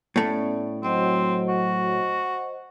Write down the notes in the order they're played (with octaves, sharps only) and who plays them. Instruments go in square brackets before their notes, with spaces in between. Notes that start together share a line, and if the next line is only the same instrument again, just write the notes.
[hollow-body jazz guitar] A2 A3 [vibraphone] B3 C#4 D5
[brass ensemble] F#3 [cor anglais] C4 [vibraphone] C5 D#5 F#5
[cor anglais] F#4